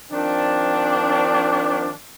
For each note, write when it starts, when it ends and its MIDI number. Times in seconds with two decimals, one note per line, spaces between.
0.11 1.90 51
0.11 1.90 53
0.11 1.90 60
0.11 1.90 62